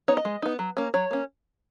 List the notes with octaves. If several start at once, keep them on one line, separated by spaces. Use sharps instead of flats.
B3 D#4 C#5
D#5
G#3
B3 D#4
F#3
A#3 C#4
F#3 C#5
A#3 C#4